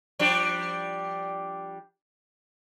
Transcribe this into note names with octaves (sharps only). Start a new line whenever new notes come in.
F3 G3 D4